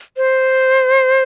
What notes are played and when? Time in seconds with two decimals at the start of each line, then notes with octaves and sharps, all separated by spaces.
0.17 C5